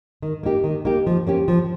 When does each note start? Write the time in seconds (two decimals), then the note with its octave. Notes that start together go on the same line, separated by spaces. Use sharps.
0.22 D#3
0.43 A#3 D#4 G4
0.64 D#3
0.85 A#3 D#4 G4
1.07 F3
1.27 A#3 C#4 G4
1.48 F3